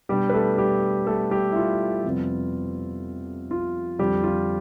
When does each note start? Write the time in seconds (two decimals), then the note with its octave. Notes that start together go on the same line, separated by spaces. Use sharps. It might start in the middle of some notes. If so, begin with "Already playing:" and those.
0.09 B2 G3 B3 D4 G4
0.29 B4
0.34 A3 A4
0.58 G3 G4
1.07 A3 A4
1.31 G3 G4
1.52 E4
1.56 F4
2.04 F2 C3 G3 B3
3.51 F4
3.99 F2 D3 F3 G3 G4
4.24 F4